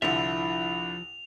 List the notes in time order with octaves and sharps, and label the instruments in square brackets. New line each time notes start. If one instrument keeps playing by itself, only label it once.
[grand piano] C2 D3 [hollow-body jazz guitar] F3 E5 [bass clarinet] E4 [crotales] F7